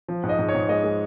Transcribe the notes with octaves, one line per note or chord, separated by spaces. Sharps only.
F3
G#2
D#5
G#2
C#5
G#2
G#3 D#5
G#3